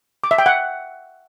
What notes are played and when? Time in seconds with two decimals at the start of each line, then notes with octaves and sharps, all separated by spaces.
0.24 D6
0.31 E5
0.38 G5
0.46 F#5